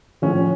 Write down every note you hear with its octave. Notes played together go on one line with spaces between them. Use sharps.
A2 F3 C#4